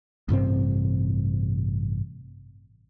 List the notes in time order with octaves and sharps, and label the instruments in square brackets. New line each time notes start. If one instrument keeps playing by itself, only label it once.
[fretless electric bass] A1 G2 C3 C4